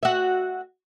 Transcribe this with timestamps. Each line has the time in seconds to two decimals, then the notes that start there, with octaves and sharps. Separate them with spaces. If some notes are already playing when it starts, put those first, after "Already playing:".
0.03 F#4 E5